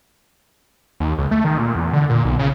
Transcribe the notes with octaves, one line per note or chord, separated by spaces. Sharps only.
D#2
C#2
A3
D#3
A#2
E2
D3
A#2
B1
C#3